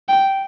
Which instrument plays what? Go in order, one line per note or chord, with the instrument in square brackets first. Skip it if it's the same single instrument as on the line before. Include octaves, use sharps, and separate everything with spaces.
[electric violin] G5